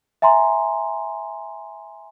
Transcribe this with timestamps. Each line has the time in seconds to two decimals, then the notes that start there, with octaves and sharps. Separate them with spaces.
0.22 E5 G#5 A#5 C6